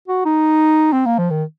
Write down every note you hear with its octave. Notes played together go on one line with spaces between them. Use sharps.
F#4
D#4
C4
A#3
F3
D#3